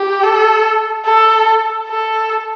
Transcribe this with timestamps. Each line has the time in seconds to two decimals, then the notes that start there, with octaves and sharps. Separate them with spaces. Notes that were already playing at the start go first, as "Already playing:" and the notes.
Already playing: G4
0.23 A4
1.06 A4
1.88 A4